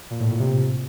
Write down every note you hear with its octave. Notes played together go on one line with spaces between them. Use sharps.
A#2
A2
A#2
C3